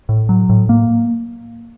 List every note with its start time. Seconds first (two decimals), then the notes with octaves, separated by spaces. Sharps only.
0.09 A2
0.29 F#3
0.49 A2
0.69 A#3